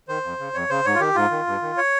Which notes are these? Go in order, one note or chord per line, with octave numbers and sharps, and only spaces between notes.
D#3 C5
F2
C#3
F2 C#5
C#3 C5
G#2 C#5
F4
D#3 G4
G#2 F4
D#3
G2
D#3
C#5